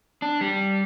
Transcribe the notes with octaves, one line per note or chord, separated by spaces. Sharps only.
D4
G3